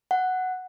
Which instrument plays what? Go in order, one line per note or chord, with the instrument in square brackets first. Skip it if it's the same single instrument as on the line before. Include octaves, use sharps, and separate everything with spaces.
[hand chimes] F#5